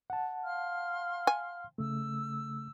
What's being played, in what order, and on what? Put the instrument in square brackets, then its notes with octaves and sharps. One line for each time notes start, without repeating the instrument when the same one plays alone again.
[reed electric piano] F#5 A5
[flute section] F5 C6 F6
[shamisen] G#5
[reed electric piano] C#3 A3 [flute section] E6